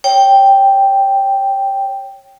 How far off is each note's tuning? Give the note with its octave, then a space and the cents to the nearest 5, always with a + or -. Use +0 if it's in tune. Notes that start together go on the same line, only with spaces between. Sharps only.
C#5 -10 G5 +0